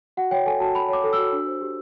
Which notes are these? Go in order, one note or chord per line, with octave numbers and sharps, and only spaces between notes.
F#4 F#5
C#5 G5
A4 G#5
F#4 A5
F#4 B5
C#5 D6
A4
F#4 E6
D4
C5
G4